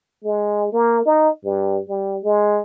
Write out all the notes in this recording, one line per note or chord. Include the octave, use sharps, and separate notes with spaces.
G#3
A#3
D#4
G2
G3
G#3